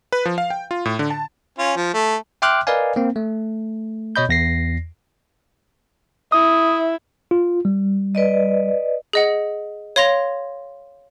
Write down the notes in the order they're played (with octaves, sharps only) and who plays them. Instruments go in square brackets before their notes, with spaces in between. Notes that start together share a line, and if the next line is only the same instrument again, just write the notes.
[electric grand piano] B4
F3
F5
G5
F4
A2
D3
A5
[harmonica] C#4 F4
F3
A3
[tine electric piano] E5 G5 C6 D6 F6 F#6
A#4 B4 D5 D#5 F5 G#5
A#3 C4
A3
B2 C#5 D#5 B5 G6
E2 A#6 C7
[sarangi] E4 [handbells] D#6
[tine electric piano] F4
G3
[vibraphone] B4 D5 D#5
[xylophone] G#4 D#5 F#5
C#5 F5 C6 A#6 F7